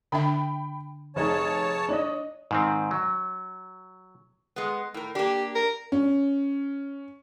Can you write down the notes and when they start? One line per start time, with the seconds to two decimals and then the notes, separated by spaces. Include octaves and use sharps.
0.12 D3 D4 E5 G5 B5
1.16 F1 D#4 G#4 C#5 A5
1.89 D4 C#5 D#5
2.51 G#2 D#3 C4
2.91 F#3
4.56 G#3 B3
4.94 A2 A#4
5.15 A#3 D4 G4
5.55 A#4
5.92 C#4